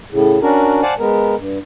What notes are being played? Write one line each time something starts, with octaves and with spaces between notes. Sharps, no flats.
A2 C#3
C#4 D4 F#4 A#4
C5 D5 F5 F#5 G#5 A5
G#3 B3 A#4
G2